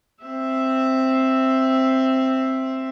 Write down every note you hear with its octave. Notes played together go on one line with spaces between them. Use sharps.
C4 E5